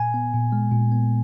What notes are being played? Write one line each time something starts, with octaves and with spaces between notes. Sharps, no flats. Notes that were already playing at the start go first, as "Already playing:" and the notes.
Already playing: A#2 G#5
B3
A#2
G#3
A#2
B3